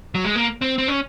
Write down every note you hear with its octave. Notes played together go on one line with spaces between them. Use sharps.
F#3
G#3
A#3
C4
C4
C#4